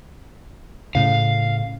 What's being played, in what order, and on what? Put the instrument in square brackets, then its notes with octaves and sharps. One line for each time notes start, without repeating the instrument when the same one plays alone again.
[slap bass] A2 C#3 [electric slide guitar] F5